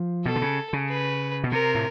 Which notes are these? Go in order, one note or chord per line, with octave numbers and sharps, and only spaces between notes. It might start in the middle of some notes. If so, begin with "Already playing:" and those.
Already playing: F3
B2 A4
D3
C#3
C#3
B4
B2
C3 A#4
A2